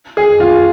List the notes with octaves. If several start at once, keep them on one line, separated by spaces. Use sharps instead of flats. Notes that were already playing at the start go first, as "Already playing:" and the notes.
G#4
F4